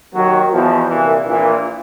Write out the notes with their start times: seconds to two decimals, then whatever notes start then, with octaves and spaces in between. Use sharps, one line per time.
0.14 D#2 D#3 F#3
0.52 E2 B2 F3
0.89 C2 A#2 E3
1.26 A#1 A#2 E3